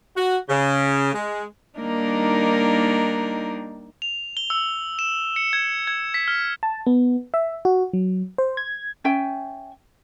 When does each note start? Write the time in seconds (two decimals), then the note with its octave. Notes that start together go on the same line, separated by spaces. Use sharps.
0.16 F#4
0.49 C#3
1.14 G#3
1.79 D#3 G3 A#3 D4 D#4 A#4
4.02 F7
4.37 G7
4.50 E6
4.99 E7
5.36 C#7
5.53 G#6
5.87 G#6
6.14 B6
6.28 F6
6.63 A5
6.86 B3
7.34 E5
7.65 F#4
7.93 F#3
8.38 C5
8.57 G#6
9.04 C#4 E5 G5 G#5